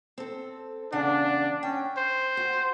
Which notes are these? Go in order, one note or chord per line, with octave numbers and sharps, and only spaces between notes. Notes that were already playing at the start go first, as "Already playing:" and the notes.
C4 A4
E2 C#3 D4 F#5
C#4 G5
C5
F#4